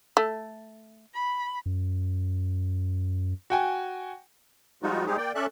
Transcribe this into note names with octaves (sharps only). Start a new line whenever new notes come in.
A3
B5
F#2
F#4 G5 G#5
F3 G3 G#3 D#4 F4 F#4
G3 G#3 C4 D#4 G4 G#4
A#3 D5 G5
C#4 A4 D5 E5 F#6